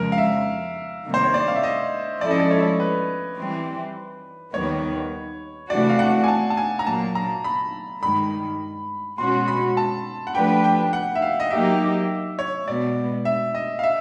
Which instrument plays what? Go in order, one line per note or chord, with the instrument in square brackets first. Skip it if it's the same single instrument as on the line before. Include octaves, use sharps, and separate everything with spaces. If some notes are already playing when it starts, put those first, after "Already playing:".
Already playing: [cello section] F2 C#3 F3 G#3 [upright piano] A#4
[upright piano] F5
E5
[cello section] C3 D#3 G3 A#3
[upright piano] C5
C#5
D5
F5
E5
D#5
[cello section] F3 G#3 C#4 E4 A4 [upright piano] D5
[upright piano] D#5
D5
C#5
B4
[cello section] E3 G3 C4
[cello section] D#2 D#3 G3 B3 [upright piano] C#5
[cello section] C3 E3 A3 D4 F#4 [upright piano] D5
[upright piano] F5
F#5
G#5
A5
A5
G#5
A#5
[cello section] A#2 F#3 A#3 [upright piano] A5
[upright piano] A#5
B5
[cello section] G2 D#3 G#3 [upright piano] B5
[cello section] B2 G#3 C#4 F#4 [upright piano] C6
[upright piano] B5
A5
F#5
[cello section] F3 A3 D4 G4 B4 [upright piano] G5
[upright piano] G5
F#5
E5
F5
D#5
[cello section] F#3 A#3 D#4 G4 [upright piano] E5
[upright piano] C#5
[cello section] B2 G#3 B3 [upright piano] D5
[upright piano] E5
D#5
F5
E5